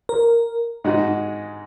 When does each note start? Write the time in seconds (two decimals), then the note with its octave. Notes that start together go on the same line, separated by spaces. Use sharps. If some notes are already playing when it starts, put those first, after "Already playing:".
0.09 A#4
0.84 G#2 G#3 D#4 F#4